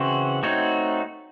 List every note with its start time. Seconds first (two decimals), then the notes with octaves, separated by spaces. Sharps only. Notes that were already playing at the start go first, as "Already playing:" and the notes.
Already playing: C#3 E3 C4 F#4
0.43 A3 C4 D#4 F#4 C#5